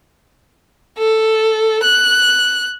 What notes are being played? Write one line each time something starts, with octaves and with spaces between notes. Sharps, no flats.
A4
F#6